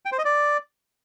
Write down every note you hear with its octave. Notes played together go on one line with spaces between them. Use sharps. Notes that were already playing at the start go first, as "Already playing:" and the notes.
G5
C5
D#5
D5